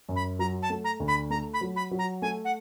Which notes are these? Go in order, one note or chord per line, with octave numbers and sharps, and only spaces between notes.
F#2
B5
F#3 A#5
A5
A3
A#5
D2
B5
A3 A#5
B5
F#3
B5
F#3
A#5
A3 G#5
F#5